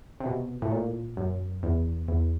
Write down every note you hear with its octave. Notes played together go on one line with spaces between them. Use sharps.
C3
B2
A2
A#2
F#2
E2
E2